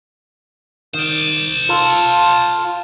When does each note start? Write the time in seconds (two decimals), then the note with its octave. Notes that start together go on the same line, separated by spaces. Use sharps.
0.94 D#3 C5 D5
1.69 F4 A4